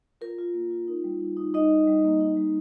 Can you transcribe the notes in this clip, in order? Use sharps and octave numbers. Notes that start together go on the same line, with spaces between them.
F4 A#4
F4
A#3
F4
D#4
G3
D#4
D#4
G3 D#4 D#5
G3
G3
A#3
D#4
G3